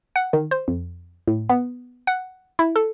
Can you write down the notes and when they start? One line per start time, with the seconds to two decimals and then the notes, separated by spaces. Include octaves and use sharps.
0.16 F#5
0.33 D#3
0.51 C5
0.68 F2
1.27 A2
1.49 B3
2.07 F#5
2.59 E4
2.76 A4